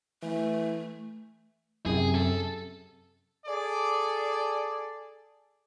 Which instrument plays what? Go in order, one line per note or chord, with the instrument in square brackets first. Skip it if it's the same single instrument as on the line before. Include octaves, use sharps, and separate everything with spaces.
[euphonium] E3 [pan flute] A3
[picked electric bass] F#2 C3 [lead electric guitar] G#4
[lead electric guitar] A4
[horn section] G#4 A4 D5